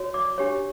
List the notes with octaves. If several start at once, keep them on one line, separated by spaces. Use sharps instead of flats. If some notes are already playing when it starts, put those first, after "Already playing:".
Already playing: F#4 C#5
D5 D6
D4 G4 C#5